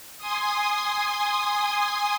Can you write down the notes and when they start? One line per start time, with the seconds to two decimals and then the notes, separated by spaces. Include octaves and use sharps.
0.18 G#5 C6 D#6